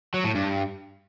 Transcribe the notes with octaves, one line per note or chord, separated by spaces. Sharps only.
F#3
A2
G2